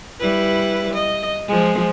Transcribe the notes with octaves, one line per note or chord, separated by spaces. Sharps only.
G3 E4 B4
D#5
F3 G#3